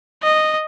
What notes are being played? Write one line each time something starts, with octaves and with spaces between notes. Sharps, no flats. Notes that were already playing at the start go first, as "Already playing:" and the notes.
D#5